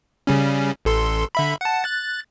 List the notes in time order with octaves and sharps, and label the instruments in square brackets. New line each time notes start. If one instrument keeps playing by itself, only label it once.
[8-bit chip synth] C#3 G3 C#4
A1 A4 C6
D3 E5 B5
F#5 A5
F#6 A6